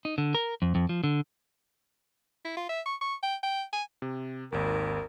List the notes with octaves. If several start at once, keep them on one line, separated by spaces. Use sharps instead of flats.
D#4
D3
A#4
F2
F2
F3
D3
E4
F4
E5
C#6
C#6
G5
G5
G#5
C3
G#1 D#2 A#4